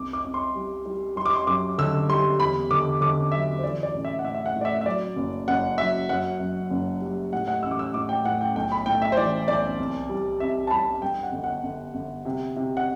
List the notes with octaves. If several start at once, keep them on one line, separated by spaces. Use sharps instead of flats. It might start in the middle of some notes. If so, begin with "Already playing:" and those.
Already playing: C2 D6
D6
C2
C6
G3
G3
G3 C6
D6
C6
F#2 D6
D3 E6
G3 C6
E2 B5
D3 D6
D3 D6
F#3 E5
C5
E3 D5
D5
A1
E5
F#5
A2 E5
E5
F#5
A2
D5
E5
E5
F#3 D5
F#1
F#1 F#5
F#3 E5
F#2 F#5
F#2
F#1
G3
A2 F#5
F#5
A1 E6
D6
E6
A2 D6
G5
A2 F#5
G5
B1 G5
B5
A2 G5
E5
C5
E3 D5
B1 D5
C2
G3
C2 E5
A5
G3 B5
G2 G5
F#5
G1
F#5
G1
G1
C3
C3
F#5